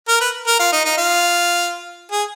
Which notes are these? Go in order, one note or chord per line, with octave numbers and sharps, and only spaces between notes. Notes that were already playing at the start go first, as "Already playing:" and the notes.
A#4
B4
A#4
F4
D#4
D#4
F4
G#4